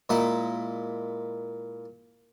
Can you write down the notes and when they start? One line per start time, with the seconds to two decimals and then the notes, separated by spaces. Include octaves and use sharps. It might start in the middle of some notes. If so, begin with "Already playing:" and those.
0.09 A#2 G#3 A#3 E4 D#6